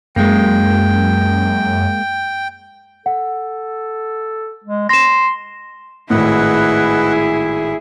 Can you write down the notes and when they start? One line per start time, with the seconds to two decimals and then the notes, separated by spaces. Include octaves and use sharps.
0.16 F#2 G#3 A#3 G5
3.06 A4 F#5
4.64 G#3
4.89 C6 A#6 E7
6.10 G#1 A2 E4 G#4 B4 D#5 F#5